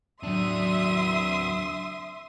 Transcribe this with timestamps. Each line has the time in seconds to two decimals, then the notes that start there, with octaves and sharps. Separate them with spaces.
0.23 F#3 D4 E5 C6 D#6